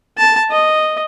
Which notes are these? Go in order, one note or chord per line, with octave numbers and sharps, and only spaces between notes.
A5
D#5